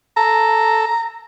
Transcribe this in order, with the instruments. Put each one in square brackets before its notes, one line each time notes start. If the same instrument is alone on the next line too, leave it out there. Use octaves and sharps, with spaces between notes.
[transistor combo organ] A4 [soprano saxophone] A#5